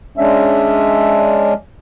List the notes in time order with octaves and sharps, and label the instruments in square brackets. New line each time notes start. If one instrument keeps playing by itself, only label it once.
[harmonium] G#3 C#4 D4 [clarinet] E5